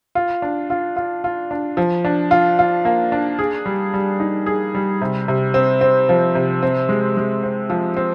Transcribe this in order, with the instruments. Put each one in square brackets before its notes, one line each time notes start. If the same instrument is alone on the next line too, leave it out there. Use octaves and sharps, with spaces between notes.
[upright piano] F4
D4
F4
F4
F4
D4
F3
D4
F4
F4
A#3
D4
G#4
G3
G3
D#4
G#4
G3
C3
C3
C4
C4
F3
C3
C4
G#3
G#3
C4
F3
C4